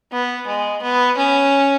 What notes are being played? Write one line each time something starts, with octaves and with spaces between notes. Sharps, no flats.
B3
G#3
B3
C#4